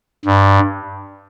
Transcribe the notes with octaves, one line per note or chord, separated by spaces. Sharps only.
G2